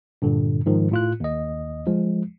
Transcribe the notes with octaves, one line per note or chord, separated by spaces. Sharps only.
G2 A#2 D3
G#2 D#3 F3
A2 F4 F#6
D#2 D#5
F3 G#3